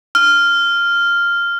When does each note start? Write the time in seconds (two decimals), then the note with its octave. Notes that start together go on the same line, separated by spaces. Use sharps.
0.15 F6